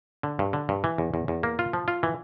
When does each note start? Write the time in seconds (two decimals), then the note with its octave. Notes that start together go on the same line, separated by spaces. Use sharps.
0.23 D3
0.39 G2
0.53 D3
0.69 G2
0.84 E3
0.98 E2
1.14 E2
1.28 E2
1.43 A#3
1.59 F4
1.73 F3
1.88 F4
2.03 E3